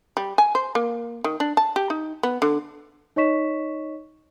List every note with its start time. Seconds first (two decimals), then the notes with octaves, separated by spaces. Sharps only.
0.17 G3
0.38 G#5
0.55 C5
0.75 A#3
1.24 D#3
1.40 D4
1.57 A5
1.76 G4
1.90 D#4
2.23 B3
2.42 D3
3.16 D#4 C#5 D#5 C#6 B6 E7